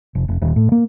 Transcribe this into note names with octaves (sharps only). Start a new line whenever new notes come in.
F1
F1
D#1
A2
A#3